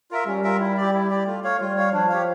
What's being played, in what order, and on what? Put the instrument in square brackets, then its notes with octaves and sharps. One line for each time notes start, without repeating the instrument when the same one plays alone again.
[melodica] F4 A#4 E5
[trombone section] G3 [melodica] C#4
[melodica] F4 A#4 E5
E4
G4 D5
E4
G4 D5
[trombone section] A3 [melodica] F4
[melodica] C#5 F5
[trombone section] G3 [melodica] F4
[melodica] C#5 F5
[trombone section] F3 [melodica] D4
[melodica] G4 C#5 F5